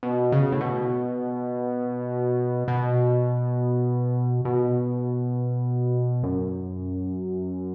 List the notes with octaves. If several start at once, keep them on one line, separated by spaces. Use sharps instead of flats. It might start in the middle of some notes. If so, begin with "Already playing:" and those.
B2
C#3
A2
B2
B2
B2
F#2